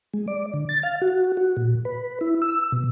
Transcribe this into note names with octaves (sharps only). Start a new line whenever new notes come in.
G#3
D5
D3
A6
F5
F#4
F#4
A#2
B4
E4
E6
B2